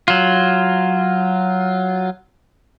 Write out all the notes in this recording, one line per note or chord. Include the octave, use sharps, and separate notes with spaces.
F#3 F4